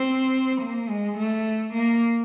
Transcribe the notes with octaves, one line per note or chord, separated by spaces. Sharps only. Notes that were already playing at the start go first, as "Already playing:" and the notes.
Already playing: C4
A#3
G#3
A3
A#3